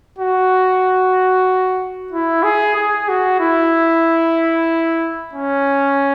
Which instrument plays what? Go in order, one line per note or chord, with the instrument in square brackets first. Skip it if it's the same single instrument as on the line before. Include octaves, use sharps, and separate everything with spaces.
[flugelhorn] F#4
E4
G#4
G#4
F#4
E4
C#4